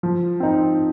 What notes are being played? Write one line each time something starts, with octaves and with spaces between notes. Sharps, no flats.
F3
C4 D#4